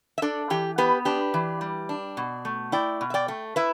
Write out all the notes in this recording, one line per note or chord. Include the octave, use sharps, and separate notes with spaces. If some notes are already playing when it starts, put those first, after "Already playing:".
E5
D4 A4 D5
E3 G4
B3 G4 B4
D4 G4 B4
E3
G3
D4
B2
A3
E4 D5 G5
B2
E5
D5 G5
A3
E4 B4 E5